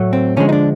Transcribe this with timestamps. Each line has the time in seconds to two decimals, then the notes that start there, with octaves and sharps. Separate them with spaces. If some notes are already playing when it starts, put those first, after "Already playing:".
Already playing: A2 F#3 A3
0.13 C4
0.37 D3 F3 G#3 C#4
0.49 D#4
0.53 D4